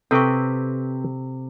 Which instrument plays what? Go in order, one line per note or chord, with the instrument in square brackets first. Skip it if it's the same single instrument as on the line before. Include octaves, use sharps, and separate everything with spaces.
[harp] C3 [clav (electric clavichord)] C4 B4 G5 [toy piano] A4 C#6